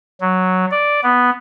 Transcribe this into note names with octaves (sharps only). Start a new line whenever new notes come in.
F#3
D5
B3